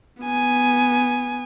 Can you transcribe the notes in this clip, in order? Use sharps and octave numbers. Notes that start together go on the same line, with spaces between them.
B3 G#5